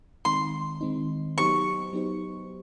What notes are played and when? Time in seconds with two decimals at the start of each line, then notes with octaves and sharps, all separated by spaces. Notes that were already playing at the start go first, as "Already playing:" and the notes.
0.25 D#3 G#3 C4 D#4 C6
0.81 D#3 G#3 C4 D#4
1.37 F#3 B3 D#4 G4 C5 C#6
1.93 F#3 B3 D#4 G4 C5